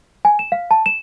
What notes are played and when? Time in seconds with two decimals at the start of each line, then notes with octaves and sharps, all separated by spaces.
0.25 G#5
0.39 E7
0.52 F5
0.71 A5
0.86 E7